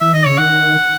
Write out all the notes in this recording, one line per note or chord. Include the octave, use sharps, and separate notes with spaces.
E3 E5
D#3 D#5
C#3 C#5
D#3 F#5